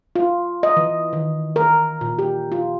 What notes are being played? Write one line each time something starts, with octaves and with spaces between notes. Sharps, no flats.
F4
D#5
E3
D#3
A#4
A#2
G4
F4